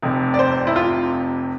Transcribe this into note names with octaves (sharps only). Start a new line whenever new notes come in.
F1 F2 C3
D5
C5
E4
F4